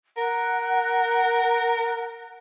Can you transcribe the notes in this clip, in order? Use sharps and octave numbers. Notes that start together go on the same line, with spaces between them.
A#4 F#5